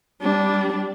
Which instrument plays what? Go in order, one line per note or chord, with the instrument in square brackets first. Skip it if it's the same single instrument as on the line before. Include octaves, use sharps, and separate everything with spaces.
[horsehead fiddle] G3 D4